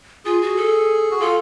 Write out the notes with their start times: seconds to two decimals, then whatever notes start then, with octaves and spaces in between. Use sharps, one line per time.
0.25 F4 G#4
0.42 F#4
0.56 A4
1.11 F#4
1.20 F4 A4